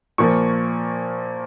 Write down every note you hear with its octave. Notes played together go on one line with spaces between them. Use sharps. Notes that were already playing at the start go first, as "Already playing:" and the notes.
A#2 F3 A#3 C#6